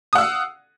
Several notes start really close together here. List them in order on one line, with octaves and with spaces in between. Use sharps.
D#6 F#5 E6 F5